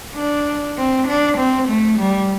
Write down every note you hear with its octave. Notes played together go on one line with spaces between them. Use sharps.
D4
C4
D4
C4
A3
G3